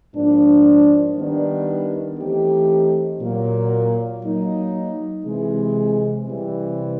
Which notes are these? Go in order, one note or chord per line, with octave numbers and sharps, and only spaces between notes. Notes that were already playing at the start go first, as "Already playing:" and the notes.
G#2 F3 A#3 D4
D#3 G3 B3 D4
E3 A3 C4 D#4 G4
A#2 F#3 A#3
F#3 A#3 D#4
C3 E3 G#3
C3 E3 G3 C4